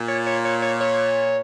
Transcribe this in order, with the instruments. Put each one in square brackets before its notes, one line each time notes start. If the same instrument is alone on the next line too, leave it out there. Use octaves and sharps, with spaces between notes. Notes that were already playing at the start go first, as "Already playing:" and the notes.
Already playing: [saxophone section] A#2
[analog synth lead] C#5
C#5
C#5
C#5
C#5